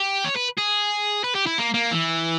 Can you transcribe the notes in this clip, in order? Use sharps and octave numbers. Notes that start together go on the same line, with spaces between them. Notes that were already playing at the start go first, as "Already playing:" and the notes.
Already playing: G4
C#5
B4
G#4
B4
G4
E4
A#3
A#3
E3